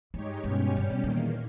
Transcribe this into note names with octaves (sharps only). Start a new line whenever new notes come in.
G2 G#3 D#4 G4 C#5
G2 B2 G#3 C#4 G4 C#5
C#3 G3 C#4 G4
B2
E2 A#2 D#3 A#3